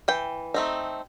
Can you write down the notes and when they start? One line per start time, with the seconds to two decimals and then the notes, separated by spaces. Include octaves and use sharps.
0.08 E3 G5
0.54 A3 C4 D#4